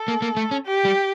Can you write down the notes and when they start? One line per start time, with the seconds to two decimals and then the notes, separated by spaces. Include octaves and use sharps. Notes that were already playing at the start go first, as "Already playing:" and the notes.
Already playing: A4
0.08 A#3
0.22 A#3
0.37 A3
0.51 C#4
0.66 G4
0.85 G3